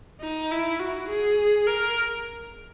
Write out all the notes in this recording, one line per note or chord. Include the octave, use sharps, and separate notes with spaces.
D#4
E4
F#4
G#4
A#4